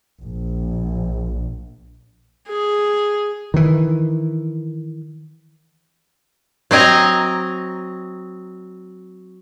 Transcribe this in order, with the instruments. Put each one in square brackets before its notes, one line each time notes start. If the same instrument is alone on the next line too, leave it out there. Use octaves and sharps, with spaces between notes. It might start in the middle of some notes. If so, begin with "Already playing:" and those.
[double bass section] A#1
[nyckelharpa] G#4
[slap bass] D#3 E3
[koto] F#3 C4 D#5 G#5 A#5